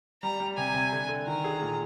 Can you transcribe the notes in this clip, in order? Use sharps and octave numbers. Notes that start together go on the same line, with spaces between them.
G3 A#5
G3
C3 G#5
C3
D3
D3
D#3 A#5
G#4
A#2